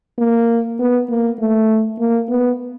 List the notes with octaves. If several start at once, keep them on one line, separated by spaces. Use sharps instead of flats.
A#3
B3
A#3
A3
A#3
B3